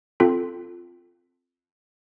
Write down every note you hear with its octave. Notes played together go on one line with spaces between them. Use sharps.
C4 F4 A4